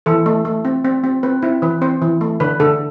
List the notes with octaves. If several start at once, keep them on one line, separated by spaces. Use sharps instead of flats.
E3 A4
A3
A3
C4
C4
C4
C4 B4
C4 E4
E3 B4
C4 C5
E3
A3
D3 B4
D3 A4